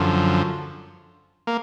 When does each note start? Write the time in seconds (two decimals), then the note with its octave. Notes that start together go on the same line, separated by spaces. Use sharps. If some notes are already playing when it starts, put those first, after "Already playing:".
Already playing: F#2 D3 F3
1.47 A#3